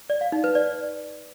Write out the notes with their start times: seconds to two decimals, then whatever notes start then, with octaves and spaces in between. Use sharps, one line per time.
0.10 D5
0.21 F5
0.32 D#4
0.44 B4
0.55 D5